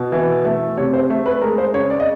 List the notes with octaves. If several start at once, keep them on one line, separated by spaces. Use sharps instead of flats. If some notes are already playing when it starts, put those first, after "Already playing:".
Already playing: B2
E3
A3
C3 C#5
C5
A3
B4
G#3 A#4
C5
C#3 C#5
D5
D#5